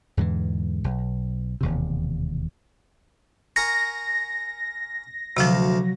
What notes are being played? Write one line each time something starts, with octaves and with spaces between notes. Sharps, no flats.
E2 G#2 D3 E3
B1
E1 D#2 C3
A#4 G#5 C#6 A#6
D2 C3 F3 F#3 F5 A5